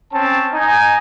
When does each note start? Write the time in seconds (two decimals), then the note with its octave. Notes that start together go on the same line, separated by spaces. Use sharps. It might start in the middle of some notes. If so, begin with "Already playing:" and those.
0.14 C4 C#4 A5
0.54 D#4 G#5